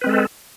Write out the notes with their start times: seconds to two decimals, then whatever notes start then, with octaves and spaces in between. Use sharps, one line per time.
0.01 B4
0.04 C4
0.07 G#3
0.09 A4